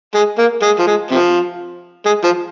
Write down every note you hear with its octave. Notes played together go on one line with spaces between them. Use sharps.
G#3
A#3
G#3
F3
G#3
C3 F3
G#3
F3